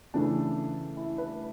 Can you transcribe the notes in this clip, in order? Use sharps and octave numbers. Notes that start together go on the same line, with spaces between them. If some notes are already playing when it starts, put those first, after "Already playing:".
C#3 E3 A3 D4
E4
B4